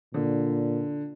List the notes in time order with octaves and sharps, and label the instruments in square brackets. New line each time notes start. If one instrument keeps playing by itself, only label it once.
[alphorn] A#2 [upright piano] D3